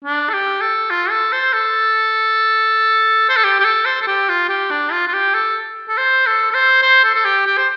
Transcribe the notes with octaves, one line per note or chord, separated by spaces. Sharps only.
D4
A4
G4
A4
F4
A4
C5
A4
C5
A4
G4
G4
A4
C5
A4
G4
F4
G4
D4
F4
F4
G4
A4
A4
C5
A4
A4
C5
C5
A4
A4
G4
G4
C5